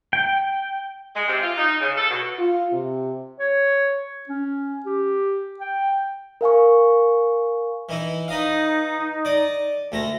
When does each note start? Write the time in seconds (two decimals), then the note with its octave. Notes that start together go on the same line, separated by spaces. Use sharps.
0.13 G5
1.15 G#3
1.27 C3
1.42 F4
1.57 D#4
1.80 C#3
1.96 A4
2.10 B2
2.38 F4
2.72 C3
3.39 C#5
4.29 C#4
4.86 G4
5.60 G5
6.41 A#4 F5 G#5 C#6
7.89 E3 D#4 E4
8.28 D#4 B4 D#5 F5
9.25 D5 D#5
9.92 D2 A3 A#5